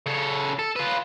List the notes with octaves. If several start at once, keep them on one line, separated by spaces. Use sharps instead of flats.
C#3 A4
A4
F4 B4